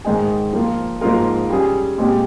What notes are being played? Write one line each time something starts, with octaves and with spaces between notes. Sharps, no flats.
G#2 D#3 G#3 D#4 G#4
F3 A#3 F4
G#2 F3 A#3 F4 A#4
G3 C#4 G#4
A#2 G#3 C4 G4